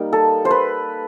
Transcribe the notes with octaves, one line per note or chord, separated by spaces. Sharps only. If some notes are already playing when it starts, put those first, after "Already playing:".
Already playing: G3 A#3 D#4
A4
C5
B4